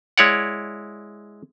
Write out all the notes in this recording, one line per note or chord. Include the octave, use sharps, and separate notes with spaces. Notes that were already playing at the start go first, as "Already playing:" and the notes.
G#3 E4 C#5 D5 F#5